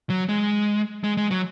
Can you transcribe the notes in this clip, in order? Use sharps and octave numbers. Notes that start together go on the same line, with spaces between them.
F#3
G#3
G#3
G#3
F#3